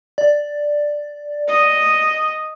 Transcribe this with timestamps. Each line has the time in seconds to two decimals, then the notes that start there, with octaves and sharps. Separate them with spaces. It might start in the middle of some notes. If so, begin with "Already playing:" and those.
0.18 D5
1.48 D#5